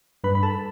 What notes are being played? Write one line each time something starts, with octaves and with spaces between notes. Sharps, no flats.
G2 B4 B5
B5
A4 A5